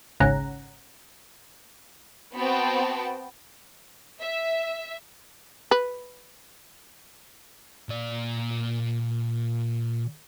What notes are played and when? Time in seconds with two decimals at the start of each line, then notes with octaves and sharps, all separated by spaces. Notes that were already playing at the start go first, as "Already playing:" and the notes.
0.20 G#1 C#2 C#4 F#5 A#5
2.34 B3 C4 F#4 G5 A5
4.22 E5
5.71 B4
7.89 A#2 D5